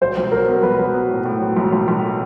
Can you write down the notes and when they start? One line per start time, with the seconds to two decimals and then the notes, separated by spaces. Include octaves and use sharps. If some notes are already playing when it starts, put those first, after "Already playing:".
0.01 F#3 C5
0.17 B1
0.32 F#3 A#4
0.47 B3
0.63 B1 B4
0.79 F#3
0.94 B3
1.10 A2
1.25 A2
1.41 F#3
1.57 B1
1.72 B1
1.88 B1